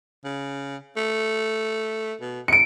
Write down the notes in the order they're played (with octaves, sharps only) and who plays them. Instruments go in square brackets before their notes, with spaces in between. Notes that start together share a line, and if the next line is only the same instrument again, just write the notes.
[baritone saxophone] C#3
A3
B2
[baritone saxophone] C#3 [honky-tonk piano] C#7 D7